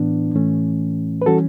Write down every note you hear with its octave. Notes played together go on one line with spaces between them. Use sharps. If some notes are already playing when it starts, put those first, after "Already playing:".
Already playing: A2 E3 B3 D4
A2 E3 A3 C#4
B4
E3 G3 C#4 F#4 A4